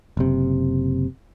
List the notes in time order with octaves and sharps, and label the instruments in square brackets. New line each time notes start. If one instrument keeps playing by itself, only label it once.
[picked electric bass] F#1 C3